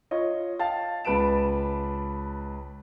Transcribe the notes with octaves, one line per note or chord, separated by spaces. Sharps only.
F4 C#5 D#5
F5 G5 A5 A6
C#2 B4 A5 D7 E7